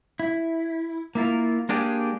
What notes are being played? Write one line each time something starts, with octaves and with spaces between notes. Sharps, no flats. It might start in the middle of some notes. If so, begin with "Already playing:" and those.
E4
A#3 E4 F4 A#4
G#3 A#3 D4 G4 G#4